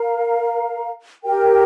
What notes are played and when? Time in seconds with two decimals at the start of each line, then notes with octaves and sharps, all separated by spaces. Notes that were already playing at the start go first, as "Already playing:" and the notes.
Already playing: A#4 F5 A#5
1.21 G4 A#4 G5